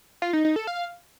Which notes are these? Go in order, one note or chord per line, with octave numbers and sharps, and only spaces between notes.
F4
D#4
D#4
A4
F5